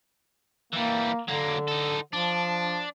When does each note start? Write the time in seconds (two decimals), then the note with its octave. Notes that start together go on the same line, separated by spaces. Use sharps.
0.73 E3 G3 A#3
1.28 D3 F#3 A#3
1.68 D#4 A4
2.13 F3 D4